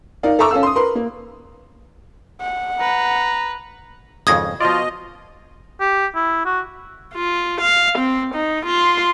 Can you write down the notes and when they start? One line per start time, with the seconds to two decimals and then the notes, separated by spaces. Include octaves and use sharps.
0.23 D#4 A#4 D5 F5
0.39 A4 E5 A#5 C#6 D6 E6
0.51 C#4 A4 F5 E6
0.63 C6 D#6
0.76 A#4 B4 C6
0.95 A#3
2.41 F#5
2.81 B4 A#5
4.27 G#1 F2 C#3 D#6 G#6 A#6
4.61 B2 F3 F4 D5 D#5
5.81 G4
6.15 E4
6.46 F#4
7.14 F4
7.61 F5
7.99 C4
8.35 D#4
8.66 F4 C6